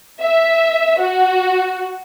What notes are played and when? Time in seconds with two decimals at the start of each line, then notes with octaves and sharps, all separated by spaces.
0.21 E5
0.99 F#4